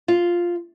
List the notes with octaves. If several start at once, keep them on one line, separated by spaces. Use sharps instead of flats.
F4